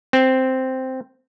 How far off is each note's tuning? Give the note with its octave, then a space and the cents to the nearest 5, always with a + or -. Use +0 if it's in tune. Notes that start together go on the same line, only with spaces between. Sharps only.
C4 -5